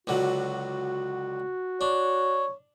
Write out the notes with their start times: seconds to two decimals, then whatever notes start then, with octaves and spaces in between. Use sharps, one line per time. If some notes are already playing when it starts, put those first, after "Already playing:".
0.07 C#2 D3 F#3 F#4
1.81 D4 C#5